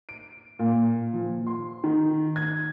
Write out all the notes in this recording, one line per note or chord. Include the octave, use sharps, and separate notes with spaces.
D7
A#2
F3
C6
D#3
G#6